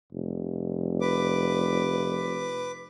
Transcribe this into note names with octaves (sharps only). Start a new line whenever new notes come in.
F1
B4 D6